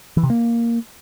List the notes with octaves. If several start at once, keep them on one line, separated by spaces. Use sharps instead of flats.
E3
C3
A#3